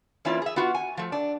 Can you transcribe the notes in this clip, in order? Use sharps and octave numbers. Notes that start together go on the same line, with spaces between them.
E3 A#3 C#4 D4 E4 F4
G#4 E5
B3 F4 F#4
G#5
F3 A3
D4